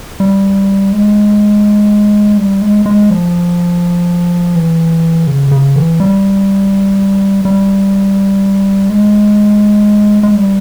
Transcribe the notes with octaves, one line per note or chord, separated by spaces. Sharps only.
G3
G#3
G3
G#3
G#3
F3
E3
C#3
C#3
E3
G3
G3
G#3
G#3
G3